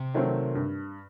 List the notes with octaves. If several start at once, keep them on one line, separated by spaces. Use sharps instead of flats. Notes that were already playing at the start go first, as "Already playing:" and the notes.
Already playing: C3
D#3 F#3 A3 C4
G2